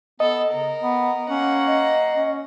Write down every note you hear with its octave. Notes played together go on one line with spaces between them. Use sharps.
B3 A4 D#5
C#3 A#4
B3
A#3 C#4 F#5
D#5
C#4